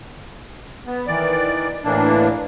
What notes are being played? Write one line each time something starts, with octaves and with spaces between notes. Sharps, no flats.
B3
D#3 E3 D5
A2 E3 A#3 D4